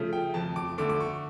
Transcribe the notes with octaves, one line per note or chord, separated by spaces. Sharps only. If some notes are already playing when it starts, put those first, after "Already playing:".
Already playing: C#3 F3 A3
G5
F2 A5
D6
D3 A3 D6
D6
C#6